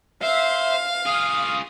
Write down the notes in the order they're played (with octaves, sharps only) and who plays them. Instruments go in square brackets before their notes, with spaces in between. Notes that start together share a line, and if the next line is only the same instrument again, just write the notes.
[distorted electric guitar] C5 [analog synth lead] E5 [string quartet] F5
[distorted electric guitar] F4 G#4 [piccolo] D#6 [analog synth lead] F6